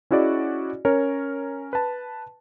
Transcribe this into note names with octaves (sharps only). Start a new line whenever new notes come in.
C#4 E4 F#4 G#4 D5 D#5
C#4 A#4 C#5
B4 A5